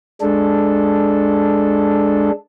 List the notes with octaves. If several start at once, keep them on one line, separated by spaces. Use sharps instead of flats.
G#3 D4 A4